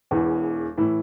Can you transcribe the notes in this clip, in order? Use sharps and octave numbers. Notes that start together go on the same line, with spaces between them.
E1 E2 E3
A2 E3 E4